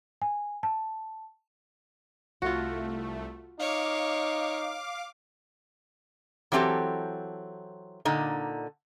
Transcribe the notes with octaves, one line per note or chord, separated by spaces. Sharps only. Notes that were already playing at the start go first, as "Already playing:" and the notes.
G#5
A5
C2 A3 F4 F#4
D#4 C#5 F5 D6
E3 F#3 C4 G4 A4
A#2 D3 D#4